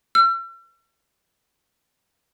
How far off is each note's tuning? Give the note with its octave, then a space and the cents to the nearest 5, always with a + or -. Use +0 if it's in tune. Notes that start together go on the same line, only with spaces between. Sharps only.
E6 +45